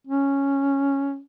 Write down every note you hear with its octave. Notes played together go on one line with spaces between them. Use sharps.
C#4